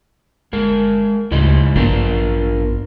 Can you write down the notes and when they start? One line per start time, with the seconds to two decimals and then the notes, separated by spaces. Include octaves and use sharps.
0.53 G1 G#3 A#4
1.31 D2 G#2 C#3 E4 D#5
1.76 A1 G2 A#3 B3 D4 F4 A#4